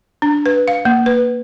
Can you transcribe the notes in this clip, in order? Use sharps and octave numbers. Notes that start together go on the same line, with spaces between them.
D4
B4
F5
A#3
B4